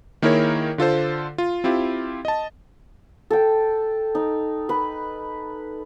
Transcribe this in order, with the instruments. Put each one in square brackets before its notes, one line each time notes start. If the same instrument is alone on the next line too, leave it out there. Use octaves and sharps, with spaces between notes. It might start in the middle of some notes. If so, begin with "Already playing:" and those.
[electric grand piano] D#3 A#3 E4 G#4 A#4 C#5
D3 F4 A4 C5
F4
C4 E4 F4 G4
D#5 A5
[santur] A4 G5
D#4
B4